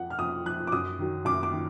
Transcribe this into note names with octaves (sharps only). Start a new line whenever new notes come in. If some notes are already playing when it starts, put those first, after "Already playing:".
Already playing: F2 F3 F#5
F6
F2 D#6
F3 F#6
D6
F#2 D#6
D#3 F#3
F#2 D6
D6
D#3